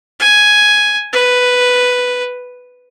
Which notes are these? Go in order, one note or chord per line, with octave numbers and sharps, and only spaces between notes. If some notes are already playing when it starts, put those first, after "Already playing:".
G#5
B4